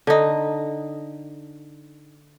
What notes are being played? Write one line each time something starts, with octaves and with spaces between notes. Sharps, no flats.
D3 D#4